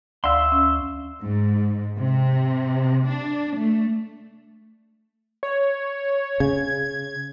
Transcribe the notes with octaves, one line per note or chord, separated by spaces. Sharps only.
D2 D5 E5 F5 C6
C#4
G#2
C3
D4
A3
C#5
C#3 G#6